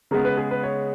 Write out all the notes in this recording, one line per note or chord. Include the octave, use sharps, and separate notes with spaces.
C#3 G#3 B3 A#4
B4
G#4
B4
C#5